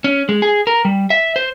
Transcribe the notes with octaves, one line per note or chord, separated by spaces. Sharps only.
C#4
G#3
G#4
A#4
G3
E5
C5